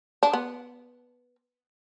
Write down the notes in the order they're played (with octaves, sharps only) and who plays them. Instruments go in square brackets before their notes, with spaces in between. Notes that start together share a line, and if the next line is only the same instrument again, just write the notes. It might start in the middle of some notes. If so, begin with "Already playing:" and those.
[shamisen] D4
B3